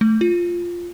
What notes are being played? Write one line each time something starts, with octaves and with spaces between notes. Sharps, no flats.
A3
F4